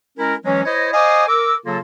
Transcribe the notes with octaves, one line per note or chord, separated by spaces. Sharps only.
G#3 C#4 E4 A#4
E3 F#3 G#3 C#4
E4 C5 C#5 D#5
C5 D#5 F5 G#5 D6 D#6
A#4 D6 E6
C#3 F#3 A#3 F4 A4